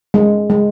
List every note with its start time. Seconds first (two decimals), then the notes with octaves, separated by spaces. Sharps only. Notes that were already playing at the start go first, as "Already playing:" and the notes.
0.14 G#3
0.50 G#3